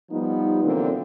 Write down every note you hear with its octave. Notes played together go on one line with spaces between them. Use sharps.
F3 G3 B3 D#4
A#2 D3 E3 F#3 A#3 C4